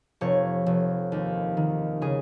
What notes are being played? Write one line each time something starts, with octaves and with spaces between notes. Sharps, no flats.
F1 C#5
F1
D#2
D#3
C#3 G#4